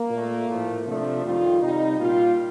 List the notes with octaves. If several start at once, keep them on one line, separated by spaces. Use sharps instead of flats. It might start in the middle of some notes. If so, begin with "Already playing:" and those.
Already playing: A#3
A#2 A3
A2 F3 A3
C3 F3 A3 D4
F2 D#3 G3 F4
C3 G3 D#4
A#2 G3 F4